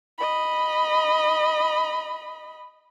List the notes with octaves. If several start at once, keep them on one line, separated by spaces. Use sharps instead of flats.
D#5 B5